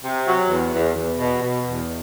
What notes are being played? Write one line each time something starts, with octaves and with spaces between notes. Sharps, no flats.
C3
F#3
E2
E2
E2
B2
B2
E2